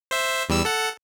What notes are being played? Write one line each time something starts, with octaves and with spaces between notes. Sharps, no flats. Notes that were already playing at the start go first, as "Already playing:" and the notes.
C5 E5
E2 G3 E6
A4 F#5